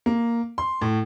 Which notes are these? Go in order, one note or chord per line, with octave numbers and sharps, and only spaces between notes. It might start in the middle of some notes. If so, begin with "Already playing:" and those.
A#3
C6
A2